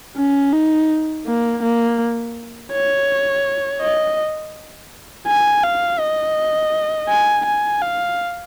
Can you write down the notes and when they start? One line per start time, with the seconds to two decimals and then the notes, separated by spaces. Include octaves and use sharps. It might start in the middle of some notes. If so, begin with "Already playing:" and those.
0.17 C#4
0.53 D#4
1.26 A#3
1.63 A#3
2.72 C#5
3.81 D#5
5.27 G#5
5.63 F5
6.00 D#5
7.09 G#5
7.45 G#5
7.82 F5